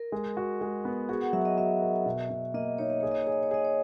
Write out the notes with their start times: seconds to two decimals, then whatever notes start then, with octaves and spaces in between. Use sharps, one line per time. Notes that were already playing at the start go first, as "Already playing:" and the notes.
Already playing: A#4
0.12 G#3
0.37 F#4
0.61 G#3
0.85 B3
1.09 F#4 G#4
1.21 F#5
1.33 F#3 E5
1.45 D#5
1.57 F#4 E5
1.82 A#4
2.06 B2
2.30 B2
2.54 A#3 D#5
2.78 D#4 C#5
2.90 D#5
3.00 G#4 C#5
3.11 D#5
3.21 C#5
3.27 G#4
3.32 D#5
3.43 C#5
3.51 G#4 D#5
3.65 C#5